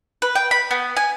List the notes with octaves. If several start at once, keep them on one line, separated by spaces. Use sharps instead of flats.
B4
G5
B5
B3
G#5